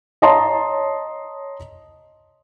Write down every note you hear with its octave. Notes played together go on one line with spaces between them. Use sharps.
C#5 D#5 A5 A#5 C6